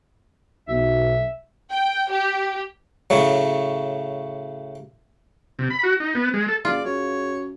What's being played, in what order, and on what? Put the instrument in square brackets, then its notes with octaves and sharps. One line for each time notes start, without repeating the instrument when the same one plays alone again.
[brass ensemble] B1 [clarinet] E5
[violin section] G5
G4
[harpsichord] A2 C#3 F#3
[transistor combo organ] C3
B5
F#4
D#4
B3
G#3
A4
[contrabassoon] F#1 [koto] F4 [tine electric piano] G#4 [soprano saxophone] D5
[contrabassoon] F#2 [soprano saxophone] C#5